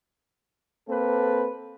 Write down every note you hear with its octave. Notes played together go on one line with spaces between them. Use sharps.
A#3 C4 A4 B4